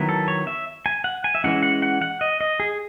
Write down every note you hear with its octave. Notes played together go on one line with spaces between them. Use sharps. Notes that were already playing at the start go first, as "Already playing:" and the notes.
Already playing: D#3 F#3 B3 E4
A4
C#5
E5
G#5
F#5
G#5
E5
E3 G#3 C#4 E4 F#5
F#5
F#5
F#5
D#5
D#5
G#4